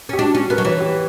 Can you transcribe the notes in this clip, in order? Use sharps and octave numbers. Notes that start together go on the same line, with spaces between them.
C#4 G4
D4 F#4
C#4 F#4
B3 A#4
F#3
E3 C#5
G4